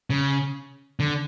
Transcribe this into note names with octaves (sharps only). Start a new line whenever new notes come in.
C#3
D3